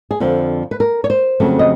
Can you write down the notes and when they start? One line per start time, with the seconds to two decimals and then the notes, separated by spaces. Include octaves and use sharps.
0.11 G#4
0.20 F2 D3 F3
0.71 B4
0.80 A#4
1.04 C#5
1.10 C5
1.40 F2 C#3 F#3 A3 C4
1.59 D#5